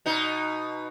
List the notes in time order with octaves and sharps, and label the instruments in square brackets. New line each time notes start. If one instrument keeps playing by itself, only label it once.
[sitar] B2 D#4